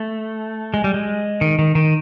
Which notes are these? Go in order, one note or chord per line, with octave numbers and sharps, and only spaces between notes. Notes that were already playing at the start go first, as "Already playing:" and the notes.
Already playing: A3
G#3
G3
G#3
D#3
D#3
D#3